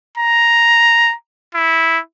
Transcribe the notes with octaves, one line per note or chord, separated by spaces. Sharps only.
A#5
E4